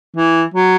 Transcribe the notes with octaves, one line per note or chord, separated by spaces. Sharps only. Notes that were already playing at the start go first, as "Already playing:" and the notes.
E3
F#3